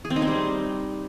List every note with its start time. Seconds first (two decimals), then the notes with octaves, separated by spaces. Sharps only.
0.05 G#4
0.10 C4
0.16 D#4
0.22 C4
0.28 G3